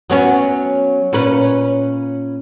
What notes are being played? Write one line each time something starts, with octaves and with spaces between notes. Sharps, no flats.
F#3 B3 C#4
A#2 C#4 B4